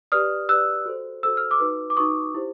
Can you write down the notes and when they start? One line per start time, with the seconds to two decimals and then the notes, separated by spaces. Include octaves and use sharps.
0.12 G4 B4 D5 D#6 F6
0.49 G4 B4 D5 E6 F#6
0.86 F#4 A4 C5
1.23 F#4 A4 C5 E6
1.37 F6
1.51 D6 E6
1.60 D#4 F#4 B4
1.90 D6
1.97 D#4 F#4 B4 C#6 D#6
2.34 E4 G4 C5